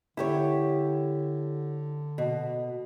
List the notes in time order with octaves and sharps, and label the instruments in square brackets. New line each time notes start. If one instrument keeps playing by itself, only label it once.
[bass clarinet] D3 [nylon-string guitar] E4 G4 C#5
[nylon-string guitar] B2